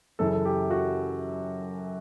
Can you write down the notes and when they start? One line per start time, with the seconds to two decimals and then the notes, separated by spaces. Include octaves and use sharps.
0.19 F#2 C#3 E3 A4
0.33 A4
0.45 G4
0.71 F#4